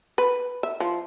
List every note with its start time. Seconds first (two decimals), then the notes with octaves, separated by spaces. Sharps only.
0.18 B4
0.63 E5
0.80 F3